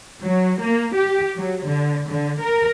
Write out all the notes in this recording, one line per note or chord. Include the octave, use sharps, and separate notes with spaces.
F#3
A#3
G4
F#3
D3
D3
A#4